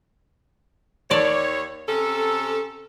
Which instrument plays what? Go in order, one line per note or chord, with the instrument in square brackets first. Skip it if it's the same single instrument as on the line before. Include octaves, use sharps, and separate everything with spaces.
[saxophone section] D#2 C#5 [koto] D5 A5
[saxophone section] C3 C#4 A4